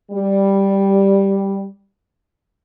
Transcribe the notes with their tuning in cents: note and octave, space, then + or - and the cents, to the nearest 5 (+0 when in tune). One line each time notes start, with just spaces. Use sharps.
G3 +0